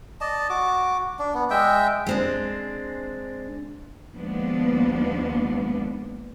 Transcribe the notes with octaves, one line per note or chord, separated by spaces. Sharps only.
D5 D#5 A5
F#4 D6
D4
B3
G#3 E5 G5
G#3 C4 D4
D#2 F3 G#3 B3 D4